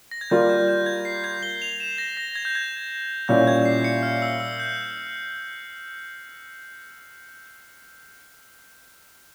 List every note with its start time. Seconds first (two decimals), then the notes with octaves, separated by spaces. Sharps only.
0.11 A#6
0.21 G#6
0.30 G3 A#3 F4 G6
0.50 G6
0.68 G6
0.86 G#6
1.05 C7
1.24 G#6
1.43 G7
1.62 F7
1.80 E7
1.98 A#6
2.17 A#6
2.35 G#6
2.45 G6
2.55 G#6
3.28 A#2 G3 C#4 E4 G6
3.47 G#6
3.65 C7
3.84 C#7
4.03 F6
4.22 E6
4.40 E6
4.59 G6